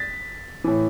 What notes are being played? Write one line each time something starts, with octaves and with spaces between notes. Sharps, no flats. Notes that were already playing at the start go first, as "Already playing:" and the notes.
Already playing: A6 B6
A2 E3